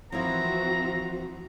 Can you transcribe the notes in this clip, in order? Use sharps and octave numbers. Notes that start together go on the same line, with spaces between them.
E3 F3 A#3 C4 E4 F#4 A#5